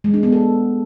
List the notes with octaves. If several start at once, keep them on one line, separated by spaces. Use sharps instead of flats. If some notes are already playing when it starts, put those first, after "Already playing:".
G#3
D4
B3
A4